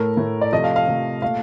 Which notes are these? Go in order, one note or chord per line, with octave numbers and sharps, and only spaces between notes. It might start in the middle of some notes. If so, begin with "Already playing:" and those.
Already playing: A2 A3 A#4
A2 A3
D5
C3 F3 A3 D#5
F5
F5
C3 F3 A3
A#2 A3 F5